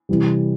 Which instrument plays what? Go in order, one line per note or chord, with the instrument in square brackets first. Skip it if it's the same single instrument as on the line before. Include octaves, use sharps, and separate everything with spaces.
[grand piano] C3 E3 G3